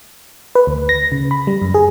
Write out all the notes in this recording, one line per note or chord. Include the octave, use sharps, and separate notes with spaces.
B4
D2
A#6
C#3
B5
G3
F#2
G#4